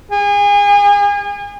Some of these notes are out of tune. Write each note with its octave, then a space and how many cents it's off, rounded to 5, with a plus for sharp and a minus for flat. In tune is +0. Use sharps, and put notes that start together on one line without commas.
G#4 -35